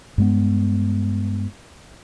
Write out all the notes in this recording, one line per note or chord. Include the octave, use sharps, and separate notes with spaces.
G2 G#3 B3